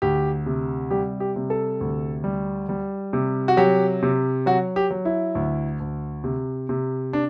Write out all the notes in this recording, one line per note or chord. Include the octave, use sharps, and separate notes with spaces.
D2 G4
C3
G3 G4
G4
C3
A4
D2
G3
G3
C3
F#4
F#3 G4
C3
F#3 F#4
G4
F#3
E4
D2
D2
C3
C3
D4